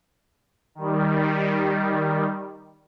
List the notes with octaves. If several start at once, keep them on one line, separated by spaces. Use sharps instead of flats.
D#3 G3